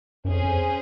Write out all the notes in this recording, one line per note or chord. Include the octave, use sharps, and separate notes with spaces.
F#2
F2 C#4 G#4 C5
F2